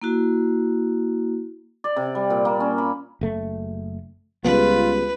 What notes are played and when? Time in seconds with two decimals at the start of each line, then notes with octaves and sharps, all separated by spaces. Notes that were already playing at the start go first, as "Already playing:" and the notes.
0.02 A#3 E4 F#4
1.84 D5
1.96 C3
2.15 G3
2.30 A#2
2.45 A#3
2.60 C#4
2.78 B5
3.21 F#1 A3
4.45 C#2 G3 A3 B3 F4 B4